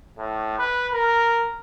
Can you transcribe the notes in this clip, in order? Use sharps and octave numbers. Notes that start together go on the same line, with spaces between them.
A2
B4
A#4